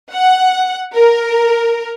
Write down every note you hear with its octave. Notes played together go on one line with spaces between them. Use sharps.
F#5
A#4